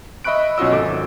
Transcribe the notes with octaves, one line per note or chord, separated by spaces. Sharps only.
D#5 E5 B5 C#6 F#6 D7
B1 C#4 F4 F#4 D#5 E6
G#1 A4 D6